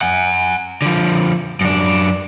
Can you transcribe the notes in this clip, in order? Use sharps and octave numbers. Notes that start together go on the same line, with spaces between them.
F#5 G#5
D3 F3
F#2 D4